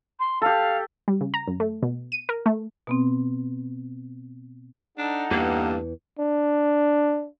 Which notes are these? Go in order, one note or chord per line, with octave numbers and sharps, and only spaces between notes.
C6
G4 A4 F5
G3
C#3
A#5
F#2
A3
B2
D#7
A#4
A3
B2 B3 C4
D4 D#4 A4 F#5
E2 G2 A#3
D4